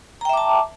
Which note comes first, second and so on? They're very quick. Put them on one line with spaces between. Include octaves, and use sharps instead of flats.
A#5 G5 E5 D6 A5